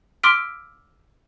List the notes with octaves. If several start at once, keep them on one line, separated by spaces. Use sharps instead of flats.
C6 D6 E6 F6 B6 D7